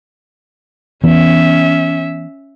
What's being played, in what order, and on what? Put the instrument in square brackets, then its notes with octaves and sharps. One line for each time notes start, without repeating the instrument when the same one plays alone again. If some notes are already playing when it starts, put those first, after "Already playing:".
[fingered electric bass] E3 B3 [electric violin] C#4 E5